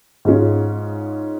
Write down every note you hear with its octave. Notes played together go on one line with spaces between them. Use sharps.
G#2 G#3 C#4 F4